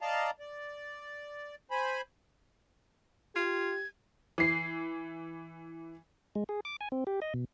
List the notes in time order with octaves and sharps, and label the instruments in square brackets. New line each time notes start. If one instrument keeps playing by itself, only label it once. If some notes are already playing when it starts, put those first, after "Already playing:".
[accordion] D5 D#5 F5 A5 A#5
D5
C5 G#5 B5
[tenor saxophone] F4 [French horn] G4 [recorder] G#6
[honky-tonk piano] E3 C7
[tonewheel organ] G#3
G#4
D6
G#5
C4
G4
D#5
B2